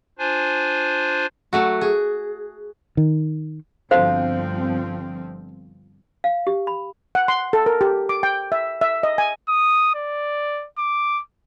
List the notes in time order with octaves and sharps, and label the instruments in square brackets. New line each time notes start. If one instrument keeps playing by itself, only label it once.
[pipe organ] D4 F4 C5 G#5
[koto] F#3 A3 F#4
G#4
[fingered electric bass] D#3
[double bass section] G1 F3 C4 [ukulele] D4 F5 [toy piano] F#4 A4 C5
[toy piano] F5
G4
B5
[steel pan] F#5
C6
A4
A#4
G4
D6
G5
E5
E5
D#5
G#5
[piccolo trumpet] D#6
D5
D6